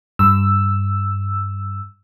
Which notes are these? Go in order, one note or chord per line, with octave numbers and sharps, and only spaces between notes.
G2 E6